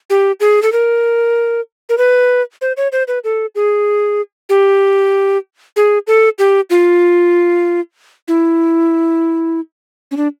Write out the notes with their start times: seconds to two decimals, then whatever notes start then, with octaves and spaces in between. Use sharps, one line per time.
0.10 G4
0.40 G#4
0.63 A4
0.72 A#4
1.89 A#4
1.98 B4
2.61 C5
2.77 C#5
2.92 C5
3.08 B4
3.24 A4
3.55 G#4
4.49 G4
5.76 G#4
6.07 A4
6.39 G4
6.70 F4
8.28 E4
10.11 C#4
10.17 D4